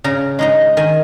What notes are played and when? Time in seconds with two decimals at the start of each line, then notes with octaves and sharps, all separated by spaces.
0.04 C#3 A#5
0.39 G#3 D#4 A#5
0.77 D#3 G#5